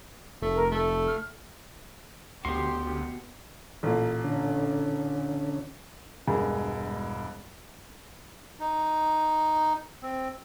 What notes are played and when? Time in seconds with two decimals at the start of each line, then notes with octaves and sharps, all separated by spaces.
0.42 F1 A3
0.54 A#4
0.71 A3 A4
1.06 F6
2.45 D2 B3 F#4 G4 C6
3.83 A1 A#2
4.24 D3 C#4
6.27 E1 G2 G#3 G#4 A#4
8.60 D#4
10.03 C4